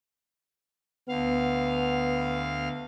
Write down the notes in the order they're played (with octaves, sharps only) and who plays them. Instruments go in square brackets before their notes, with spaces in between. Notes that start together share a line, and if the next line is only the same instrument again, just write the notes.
[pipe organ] D2 F5 [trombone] B3